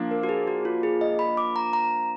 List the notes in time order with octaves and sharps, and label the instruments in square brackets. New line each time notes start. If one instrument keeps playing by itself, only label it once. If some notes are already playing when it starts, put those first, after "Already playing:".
Already playing: [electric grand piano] F3 A#3 D4
[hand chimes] A#4
F#4
G#4
F#4
F4
G#4
D#5
B5
D6
A#5
A#5